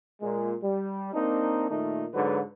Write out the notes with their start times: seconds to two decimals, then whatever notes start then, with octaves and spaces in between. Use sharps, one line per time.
0.21 A#2 G#3
0.63 G3
1.14 A#3 C4 D4 D#4
1.71 A#2 D#3 A3 D#4
2.14 G#2 D3 F#3 D#4 B4